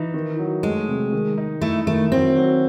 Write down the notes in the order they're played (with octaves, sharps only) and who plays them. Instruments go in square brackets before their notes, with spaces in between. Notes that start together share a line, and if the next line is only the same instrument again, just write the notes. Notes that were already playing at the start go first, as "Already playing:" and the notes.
Already playing: [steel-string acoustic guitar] E3 [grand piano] D#4
[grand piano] D#3
F#3
[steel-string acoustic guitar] G#3 [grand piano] A3
[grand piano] C3
D#3
D#4
[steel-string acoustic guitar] A3 [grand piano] E4
[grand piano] D#3 [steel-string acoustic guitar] A3
[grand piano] F#3 [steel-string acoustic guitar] C4
[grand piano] F#3